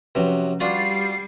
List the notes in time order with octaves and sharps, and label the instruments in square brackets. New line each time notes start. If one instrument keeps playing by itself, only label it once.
[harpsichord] C3 F#3 [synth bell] F3 C#4 B4
[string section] G3 C7 [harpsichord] D4 F4 F#4 [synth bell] A6